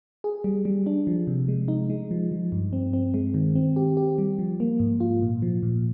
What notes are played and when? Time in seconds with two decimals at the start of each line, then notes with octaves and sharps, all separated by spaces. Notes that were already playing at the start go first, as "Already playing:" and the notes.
0.24 G#4
0.44 G3
0.65 G3
0.86 D4
1.07 F3
1.27 C3
1.48 G#3
1.68 D#4
1.90 G#3
2.11 F3
2.32 F3
2.52 G2
2.73 C4
2.93 C4
3.14 G#3
3.34 D#3
3.55 C4
3.76 G4
3.97 G4
4.18 G3
4.39 F3
4.60 A#3
4.80 G#2
5.00 F4
5.22 A#2
5.42 F3
5.63 A#2